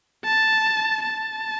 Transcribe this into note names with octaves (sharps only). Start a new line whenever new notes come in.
A5
A5